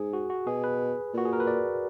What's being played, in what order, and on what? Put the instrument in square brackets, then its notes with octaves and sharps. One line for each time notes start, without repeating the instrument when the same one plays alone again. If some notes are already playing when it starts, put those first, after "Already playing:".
Already playing: [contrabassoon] G#2 [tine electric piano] G#4
[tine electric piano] F#4
F#4
[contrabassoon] B2 [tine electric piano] G#4
[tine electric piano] B4
[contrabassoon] A#2 [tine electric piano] F#4
[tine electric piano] G#4
A#4
B4
D5